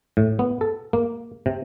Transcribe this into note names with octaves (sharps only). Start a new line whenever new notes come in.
A2
B3
A4
A#3
C3